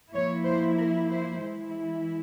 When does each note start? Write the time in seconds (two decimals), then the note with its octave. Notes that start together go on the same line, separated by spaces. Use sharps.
0.12 F3 A#3 E4 C#5
0.45 C5
0.77 A#4
1.09 C5
1.42 E3 G#3 E4